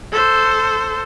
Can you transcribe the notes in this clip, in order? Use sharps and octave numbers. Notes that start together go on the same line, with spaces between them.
A4 C5